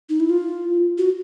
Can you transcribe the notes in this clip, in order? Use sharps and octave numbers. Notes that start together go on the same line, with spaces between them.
D#4
E4
F4
F#4